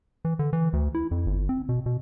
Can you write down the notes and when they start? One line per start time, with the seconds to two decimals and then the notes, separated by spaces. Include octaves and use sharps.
0.25 E3
0.39 D3
0.53 E3
0.73 D2
0.95 E4
1.11 F2
1.26 G1
1.49 C4
1.69 B2
1.86 B2